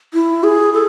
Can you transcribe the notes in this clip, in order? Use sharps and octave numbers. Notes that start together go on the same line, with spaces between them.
E4
G#4
A4